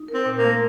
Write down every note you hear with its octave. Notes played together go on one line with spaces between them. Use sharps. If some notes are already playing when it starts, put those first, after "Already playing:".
Already playing: D#4
A#4
C4
A#2
A#3
A3